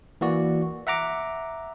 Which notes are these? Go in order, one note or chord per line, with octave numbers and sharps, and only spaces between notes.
E3 A#3 F#4 D5
E5 F#5 A#5 D6